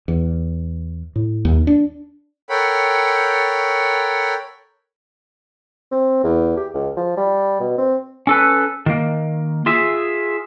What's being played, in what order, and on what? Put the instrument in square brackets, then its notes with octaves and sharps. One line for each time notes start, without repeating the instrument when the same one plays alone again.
[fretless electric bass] E2
A2
D#2
D4
[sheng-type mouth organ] A4 A#4 C#5 F#5 G5 B5
[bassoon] C4
E2
G4
C#2
F3
G3
B2
C4
[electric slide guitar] C#4 A4 B4
D#3 A#3
F4 G#4 E5